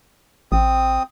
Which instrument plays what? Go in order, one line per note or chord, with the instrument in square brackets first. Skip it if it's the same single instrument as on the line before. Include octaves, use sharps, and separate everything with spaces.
[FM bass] A1 [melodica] C4 D#6